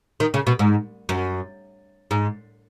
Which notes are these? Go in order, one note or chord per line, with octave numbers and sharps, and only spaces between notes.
D#3
C#3
B2
G#2
F#2
G#2